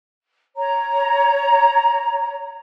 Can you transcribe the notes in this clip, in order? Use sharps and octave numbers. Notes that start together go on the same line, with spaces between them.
C#5 A#5